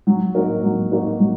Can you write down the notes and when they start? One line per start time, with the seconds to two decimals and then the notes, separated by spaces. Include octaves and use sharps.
0.07 F#3
0.35 A#3 D#4 F#4 A#4
0.63 F#3
0.92 A#3 D#4 F#4 A#4
1.20 F#3